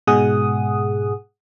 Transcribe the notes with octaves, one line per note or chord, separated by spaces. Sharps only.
G#2 B2 G#3 G#4 F#5 D#6